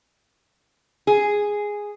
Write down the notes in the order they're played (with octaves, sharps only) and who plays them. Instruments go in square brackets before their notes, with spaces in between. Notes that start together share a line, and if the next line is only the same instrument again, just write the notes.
[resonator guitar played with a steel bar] G#4